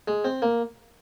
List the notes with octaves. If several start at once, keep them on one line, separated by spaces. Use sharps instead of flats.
G#3
C4
A#3